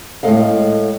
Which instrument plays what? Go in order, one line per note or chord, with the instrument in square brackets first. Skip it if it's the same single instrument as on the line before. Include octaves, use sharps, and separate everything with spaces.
[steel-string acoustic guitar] A2 G#3 A#3 A4 D#5 F5